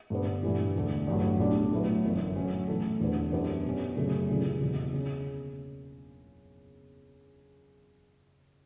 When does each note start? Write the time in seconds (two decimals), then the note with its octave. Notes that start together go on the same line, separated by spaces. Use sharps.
0.10 G2 D3 G3 B3
0.43 G2 E3 G3
0.75 E1 D2 D3 G3
1.07 A1 G2 F#3
1.39 B1 A2 G3 D4
1.72 A2 F#3 A3 E4 B4
2.04 G1 F#2 E3 A3
2.36 A2 F#3 C#4
2.68 A2 E3 B3 E4 A4
3.00 E1 E2 D3 G3 B3
3.32 F#2 E3 B3 D4 G4
3.65 B2 G3 C#4
3.96 F#2 C#3 F#3 A3 C#4
4.29 C#2 C#3 E3 G3 C#4
4.61 F#1 E2 B2
4.93 C#3